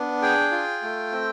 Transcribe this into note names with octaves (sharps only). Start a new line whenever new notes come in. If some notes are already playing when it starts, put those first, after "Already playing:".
Already playing: B3 D4
G#4 G5
F4
A3
C4